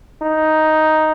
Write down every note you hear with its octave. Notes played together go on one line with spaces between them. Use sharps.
D#4